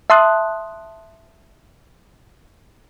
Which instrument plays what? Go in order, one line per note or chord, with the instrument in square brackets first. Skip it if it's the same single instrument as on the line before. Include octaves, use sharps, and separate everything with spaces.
[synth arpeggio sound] E5 A5 C6 D#6 F#6